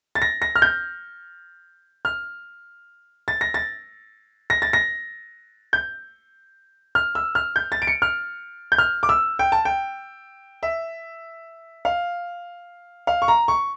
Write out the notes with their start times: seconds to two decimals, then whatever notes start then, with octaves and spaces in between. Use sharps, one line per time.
0.15 A6
0.22 A#6
0.42 A#6
0.56 F6
0.62 G6
2.05 F6
3.28 A6
3.41 A#6
3.54 A6
4.50 A#6
4.62 A6
4.73 A#6
5.73 G6
6.95 F6
7.15 E6
7.35 F6
7.56 G6
7.72 A6
7.82 D7
7.87 C#7
8.02 F6
8.72 G6
8.78 F6
9.03 D6
9.09 E6
9.39 G5
9.52 A5
9.65 G5
10.63 E5
11.85 F5
13.07 F5
13.22 C#6
13.28 A#5
13.48 C#6